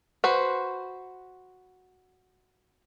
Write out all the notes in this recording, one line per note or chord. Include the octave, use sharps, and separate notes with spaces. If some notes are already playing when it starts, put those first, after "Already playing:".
F#4 B4 C5